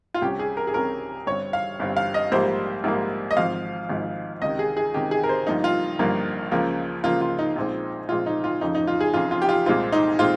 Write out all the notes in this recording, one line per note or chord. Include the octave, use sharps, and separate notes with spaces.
F4
C2 C3 G3 C#4 G4
G#4
A#4
G#4
C2 C3 G3 C#4 A#4
G1 G2 G3 C4 C#5
F5
G1 G2 G3 C4
F5
D#5
A#1 G#2 G3 A#3 C5
A#1 G#2 G3 A#3
D#5
G#1 G#2 F3 F5
G#1 G#2 F3
C#2 C3 D#3 D#5
G#4
G#4
C#2 C3 D#3 G4
G#4
A#4
C5
G1 G2 F3 A#3 D#4
F4
G1 G2 F3 A#3
C#2 C#3 F3 A#3
C#2 C#3 F3 A#3 F4
F4
D#4
A#1 A#2 G#3 C4
A#1 A#2 G#3 C4 F4
D#4
F4
F1 F2 C#3 F3 D#4
D#4
F4
G#4
F1 F2 C#3 F3 F4
F4
G4
F4
C2 A#2 G#3 C4 F4
D#4
A#2 G#3 C4 F4